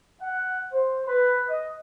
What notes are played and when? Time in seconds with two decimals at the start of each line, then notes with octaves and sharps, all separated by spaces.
0.21 F#5
0.73 C5
1.06 B4
1.48 D#5